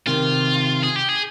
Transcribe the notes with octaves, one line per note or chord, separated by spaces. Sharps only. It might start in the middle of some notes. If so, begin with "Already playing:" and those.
C3 D#3 F4
G#4
G4
G#4